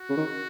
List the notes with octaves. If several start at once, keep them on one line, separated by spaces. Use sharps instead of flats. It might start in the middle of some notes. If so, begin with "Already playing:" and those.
Already playing: F#4
C#3
D#3